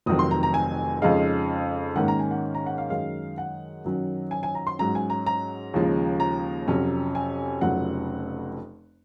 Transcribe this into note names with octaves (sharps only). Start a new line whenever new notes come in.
F1 F2 D#3 F#3 C4 D#6
C6
A#5
A#5
G#5
F2 C#3 G#3 D#4 F5
G#2 D#3 A#3 C#4 F#5
A#5
G#5
F#5
A#5
F#5
F5
F#2 D#3 G#3 F5
F#5
F#2 D#3 F#3 C#4
G#5
G#5
A#5
C6
G#2 F#3 C#4 A#5
G#5
A#5
A#5
D#2 C#3 F3 G#3
A#5
F2 C3 F#3 C#4
G#5
F1 F2 C#3 F#3 F#5